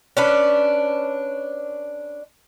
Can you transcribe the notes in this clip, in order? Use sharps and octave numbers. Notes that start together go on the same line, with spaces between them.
C#4 D4 B4